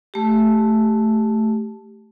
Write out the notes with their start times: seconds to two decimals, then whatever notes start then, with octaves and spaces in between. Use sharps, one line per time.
0.14 A3 G4